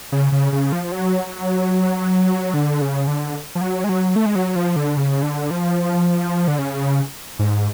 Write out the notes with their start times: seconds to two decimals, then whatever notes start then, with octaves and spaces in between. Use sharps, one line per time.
0.12 C#3
0.32 C#3
0.52 C#3
0.72 F3
0.92 F#3
2.54 D3
2.81 C#3
3.07 D3
3.55 F3
3.61 F#3
3.84 G#3
3.89 F#3
4.16 A3
4.26 G#3
4.35 F#3
4.56 F3
4.76 D3
4.97 C#3
5.23 D3
5.51 F3
6.48 D3
6.58 C#3
7.39 G#2